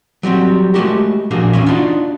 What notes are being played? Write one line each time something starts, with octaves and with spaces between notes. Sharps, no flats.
F#3 G3 C4 F#4
G#3 A3 C#4 F#4 G4 A#4
A#2 F3 A#3 D4 F#4 G#4
D#2 G#2 E3 C#4 E5
D4 D#4 F4 F#4